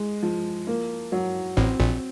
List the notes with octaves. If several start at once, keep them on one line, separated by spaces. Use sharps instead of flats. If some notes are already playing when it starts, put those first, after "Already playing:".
Already playing: G#3
F3
A#3
F#3
A1 A2 C4
A#1 A#2